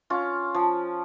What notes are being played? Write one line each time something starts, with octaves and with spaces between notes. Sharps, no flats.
C#4 F4
F3